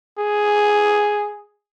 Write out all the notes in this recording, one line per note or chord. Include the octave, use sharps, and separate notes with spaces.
G#4